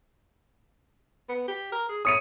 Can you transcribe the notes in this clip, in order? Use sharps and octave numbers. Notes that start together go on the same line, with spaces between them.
B3
G4
A#4
G#4
C#5 D#6 C#7 D#7